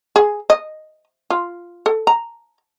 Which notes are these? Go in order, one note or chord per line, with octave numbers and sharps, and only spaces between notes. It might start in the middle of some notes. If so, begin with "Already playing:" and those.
G#4
D#5
F4
A4
A#5